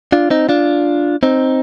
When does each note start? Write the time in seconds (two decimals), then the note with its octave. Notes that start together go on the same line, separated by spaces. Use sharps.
0.12 D4 F4
0.30 C4 D#4
0.49 D4 F4
1.23 C4 D#4